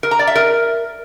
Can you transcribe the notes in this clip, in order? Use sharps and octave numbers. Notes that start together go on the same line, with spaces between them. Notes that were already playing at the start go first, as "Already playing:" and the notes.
A#4
A#5
D5
E5
A#4